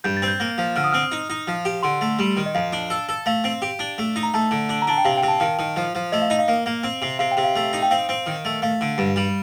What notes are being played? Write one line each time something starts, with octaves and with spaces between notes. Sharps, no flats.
G2 G6
A6
C4
G6
A#3
F3
D3 F6
D#6
C4 F6
D#4
D#4
F3
G4
D3 C6
A3
G3
D#3
D#5
F2 F5
D4
A4
A4
A3 F5
C4
G4
D4
A3
D#4
A#5
A3 A5
D3
D4
A#5
D4 A5
G5
C3 F5
G5
C3
A5
D#3 F5
D#3
F3
F3
A3 D#5
F5
D#4 D#5
F5
A#3
A#3
C4
C3
C3 F5
G5
C3
F5
A3
D#4
G5
C4 F5
C4
D#3
A3
A3 F5
D3
G2
G3